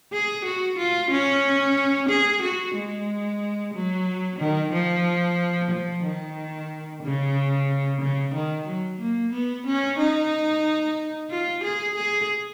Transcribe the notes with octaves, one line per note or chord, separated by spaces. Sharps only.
G#4
F#4
F4
C#4
G#4
F#4
G#3
F#3
D#3
F3
F3
D#3
C#3
C#3
D#3
F#3
A#3
B3
C#4
D#4
F4
G#4
G#4